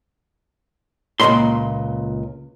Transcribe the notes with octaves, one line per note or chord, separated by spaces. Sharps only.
C#2 A#2 C4 D#5 B5 C6